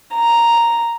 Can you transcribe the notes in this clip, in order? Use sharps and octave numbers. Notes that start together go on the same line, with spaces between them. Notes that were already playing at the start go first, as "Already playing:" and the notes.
A#5